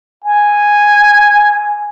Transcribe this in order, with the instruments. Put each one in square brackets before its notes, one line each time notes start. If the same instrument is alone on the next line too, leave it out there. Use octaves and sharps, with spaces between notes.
[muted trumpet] G#5